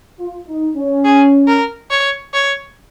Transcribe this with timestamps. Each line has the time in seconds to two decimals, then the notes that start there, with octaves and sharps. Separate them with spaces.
0.19 F4
0.47 D#4
0.76 C#4
1.05 G#4
1.48 A#4
1.91 C#5
2.34 C#5